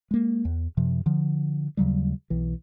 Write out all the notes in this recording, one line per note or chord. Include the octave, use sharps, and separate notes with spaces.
G#3 A#3
E2
F#2 C3 F3
D3 F3
D#2 C#3 F#3 G3
B1 E3